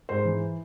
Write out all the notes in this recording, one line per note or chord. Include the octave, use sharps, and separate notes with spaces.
G#2 C5
E3